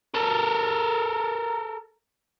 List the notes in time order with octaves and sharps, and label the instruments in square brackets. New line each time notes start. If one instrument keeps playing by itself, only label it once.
[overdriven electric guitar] A4 A#4